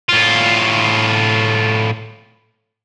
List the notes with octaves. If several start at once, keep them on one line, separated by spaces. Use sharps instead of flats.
A2 F4